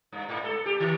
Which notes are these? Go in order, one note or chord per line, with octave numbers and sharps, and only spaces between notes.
G2
G#2
A4
G4
D#3